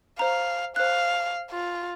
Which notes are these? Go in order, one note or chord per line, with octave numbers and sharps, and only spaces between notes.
C5 F5 A#5
C5 F5 F#6
F4